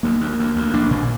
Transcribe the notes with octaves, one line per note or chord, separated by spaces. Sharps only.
D2 A#3
D2
D2
D2
A#1 D4
A#2